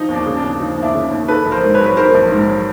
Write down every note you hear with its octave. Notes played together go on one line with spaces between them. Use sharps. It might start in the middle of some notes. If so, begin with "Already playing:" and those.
Already playing: F3 D#4
D#2
D4
C#3
D4
D#2
F3 D#4
D#2
D4 E4
C#3
D#2
D#3 A4 B4
A#1
A#4 C5
G#2
B4 C#5
F#3
B4
D#3 A#4 C5
A#1
G#2
F#3